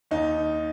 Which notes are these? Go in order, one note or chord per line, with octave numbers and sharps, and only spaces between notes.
D#2 D#4